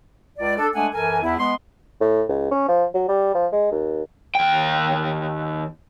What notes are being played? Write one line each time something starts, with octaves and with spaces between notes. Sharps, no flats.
C#2 D5
D4 A4
G#3 A3 D4 A4 F#5 G#5
F#2 E3 A4 A#4 G#5
E2 B3 E4
G#3 B3 C6
A2
C#2
C#4
F3
F#3
G3
F3
G#3
D#2
D#2 G5